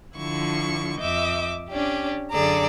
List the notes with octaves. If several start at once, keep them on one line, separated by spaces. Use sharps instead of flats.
D3 F3 E4 C#6
F2 D#5 E5 D6 G6
C#4 D4 G4
F#2 D3 G#4 A4 D5 A#5